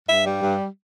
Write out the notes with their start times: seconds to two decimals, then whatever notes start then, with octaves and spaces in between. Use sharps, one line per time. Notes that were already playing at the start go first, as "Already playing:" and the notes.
0.08 G2 E5
0.25 G3
0.43 G2